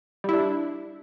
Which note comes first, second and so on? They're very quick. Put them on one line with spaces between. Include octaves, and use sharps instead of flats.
G3 E4 D4